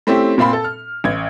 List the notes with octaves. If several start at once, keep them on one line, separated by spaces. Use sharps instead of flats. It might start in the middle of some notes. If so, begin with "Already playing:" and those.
A3 C4 C#4 E4 G4
A#2 C4 F5 B5 C6
A4
F6
A1 G#6